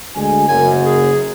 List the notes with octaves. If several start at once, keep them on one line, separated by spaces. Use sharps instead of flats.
D2 G#3 G#5
F#1 F#2 G#5
G#4